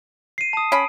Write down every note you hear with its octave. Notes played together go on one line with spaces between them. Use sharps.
C7 D#7
A5 D#6
C#4 B5 D7